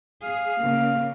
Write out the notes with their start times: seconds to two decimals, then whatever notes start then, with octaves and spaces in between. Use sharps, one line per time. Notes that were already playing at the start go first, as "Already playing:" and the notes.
0.23 G#4 F5
0.62 C#3 A#3